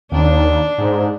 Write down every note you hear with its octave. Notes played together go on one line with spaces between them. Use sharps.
D#2 D4
G#2